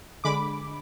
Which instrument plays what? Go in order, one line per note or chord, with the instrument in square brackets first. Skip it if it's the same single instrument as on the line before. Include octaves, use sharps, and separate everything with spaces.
[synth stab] D3 G#3 B5 D6